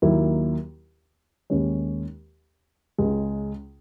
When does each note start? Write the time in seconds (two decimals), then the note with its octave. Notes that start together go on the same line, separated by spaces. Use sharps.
0.02 D#2 D#3 F#3 A#3 E4
1.50 D#2 D#3 G#3 C#4
2.98 C#2 C#3 G#3